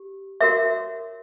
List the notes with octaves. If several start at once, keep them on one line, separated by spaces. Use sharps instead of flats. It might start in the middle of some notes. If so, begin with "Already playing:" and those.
Already playing: G4
F#4 A#4 C#5 E5